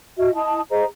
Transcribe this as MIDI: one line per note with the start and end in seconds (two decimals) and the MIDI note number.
0.18 0.32 66
0.18 0.32 75
0.18 0.32 76
0.35 0.60 64
0.35 0.60 75
0.35 0.60 81
0.35 0.60 87
0.70 0.84 68
0.70 0.84 72
0.70 0.84 75
0.70 0.84 82